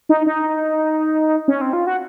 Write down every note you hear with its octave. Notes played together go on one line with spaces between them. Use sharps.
D#4
D#4
C#4
C4
F4
F#4